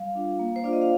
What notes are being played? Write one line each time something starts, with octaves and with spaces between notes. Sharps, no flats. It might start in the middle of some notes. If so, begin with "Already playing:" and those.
Already playing: G3 F5
D4 F4
A#3
C5
D4 F4 D5
D#5
F5